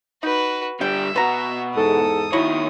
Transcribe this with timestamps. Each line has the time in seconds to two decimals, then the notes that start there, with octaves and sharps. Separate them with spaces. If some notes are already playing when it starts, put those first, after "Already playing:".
0.23 D#4 F#4 B4
0.81 D3 G3 E5 G5
1.16 B2 B3 F#4 A#5
1.76 E2 G#2 A4 D#6
2.33 D#3 F#3 E4 C#5